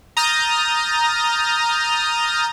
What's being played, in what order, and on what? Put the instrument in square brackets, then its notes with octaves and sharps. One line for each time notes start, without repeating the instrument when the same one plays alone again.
[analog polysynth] A#5 D#6 F6 G6 A6